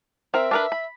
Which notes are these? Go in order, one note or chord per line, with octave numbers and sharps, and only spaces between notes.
C4 A#4 E5
D4 A#4 B4
B5